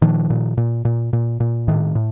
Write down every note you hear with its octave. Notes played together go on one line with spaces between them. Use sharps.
A#2 D#3 F3
A#2
A#2
A#2
A#2
A#2
A2 D#3
A2